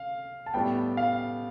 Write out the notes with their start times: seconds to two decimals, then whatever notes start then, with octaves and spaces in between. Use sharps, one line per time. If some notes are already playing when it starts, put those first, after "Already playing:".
Already playing: F5
0.46 A5
0.54 A2 G3 B3 G5
0.97 F5